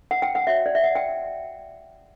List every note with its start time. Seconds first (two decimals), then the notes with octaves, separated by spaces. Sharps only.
0.11 F#5
0.22 G5
0.35 F#5
0.47 F#4 C#5 E5
0.66 D5
0.75 E5
0.84 F#5
0.95 G5